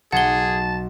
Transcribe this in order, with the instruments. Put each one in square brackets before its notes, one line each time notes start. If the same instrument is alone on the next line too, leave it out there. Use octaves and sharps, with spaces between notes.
[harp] B1 [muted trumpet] G#4 [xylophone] F#5 G7 [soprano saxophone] A5